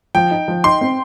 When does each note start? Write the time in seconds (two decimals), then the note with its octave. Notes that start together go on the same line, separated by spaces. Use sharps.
0.15 F3 G5
0.31 D#4
0.48 F3
0.64 D#4 C6
0.81 C4